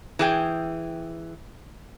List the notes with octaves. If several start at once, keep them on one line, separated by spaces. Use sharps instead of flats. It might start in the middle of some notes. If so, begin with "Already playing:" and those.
E3 G#4 G5